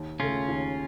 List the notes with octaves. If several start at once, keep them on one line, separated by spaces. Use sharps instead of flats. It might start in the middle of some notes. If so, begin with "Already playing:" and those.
Already playing: D#2
C#3 A3 C#4 F4
D#2